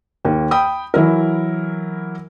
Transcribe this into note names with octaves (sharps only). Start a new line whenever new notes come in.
D#2 A#3
G5 B5 D#6
E3 F#3 E4 A#4